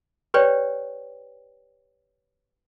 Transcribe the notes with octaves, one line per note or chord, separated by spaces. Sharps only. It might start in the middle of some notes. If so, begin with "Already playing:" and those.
G4 B4 C#5 D5 G5